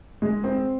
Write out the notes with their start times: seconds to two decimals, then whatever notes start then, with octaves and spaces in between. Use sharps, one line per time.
0.22 G#3
0.44 C4